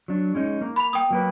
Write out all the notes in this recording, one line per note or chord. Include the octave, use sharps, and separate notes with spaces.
F#3 D4
G#3 C#4 D#4
A#3
B5 F7
G5 D#6
F#3 A#3 B4